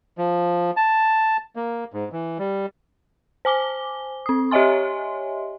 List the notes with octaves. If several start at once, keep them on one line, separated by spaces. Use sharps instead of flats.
F3
A5
A#3
G#2
E3
G3
C5 G#5 D6 G7
C4 D#6
G4 C#5 D#5 E5 G#5 C6